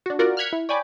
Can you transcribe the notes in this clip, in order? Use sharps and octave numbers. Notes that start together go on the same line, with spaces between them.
D4 F#4
F4 F#4 A#4 D5
F6 F#6 G#6 B6 C#7
E4
C#5 D5 G5 G#5 B5 D6